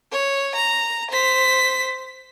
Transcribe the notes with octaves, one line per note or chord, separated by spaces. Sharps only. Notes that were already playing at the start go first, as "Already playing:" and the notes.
C#5
A#5
C5 B6